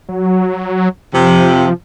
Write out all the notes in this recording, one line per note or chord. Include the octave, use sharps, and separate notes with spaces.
F#3
F2 C3 F3